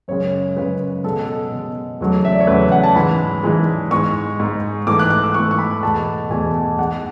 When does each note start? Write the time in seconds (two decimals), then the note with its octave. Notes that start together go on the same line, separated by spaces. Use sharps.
0.08 F#2 C#3 G#3 C#5
0.56 F#2 C#3 G#3 B4
1.04 B2 G#3 A4
1.28 A4
1.52 B2 G#3
2.00 E2 C#3 F#3 A3
2.25 E5
2.32 D5
2.40 C#5
2.47 E2 C#3 F#3 A3 B4
2.72 F#5
2.83 A5
2.96 G#2 E3 G#3 B5
3.43 G#2 E3 G#3
3.91 G#2 G#3 C#6
4.40 G#2 G#3
4.87 G#2 E3 A3 D6
4.99 F#6
5.10 F#6
5.23 E6
5.34 G#2 E3 A3 C#6
5.51 C#6
5.59 B5
5.83 E2 B2 A3 A5
6.30 E2 B2 A3 G#5
6.79 G#2 G#3 F#5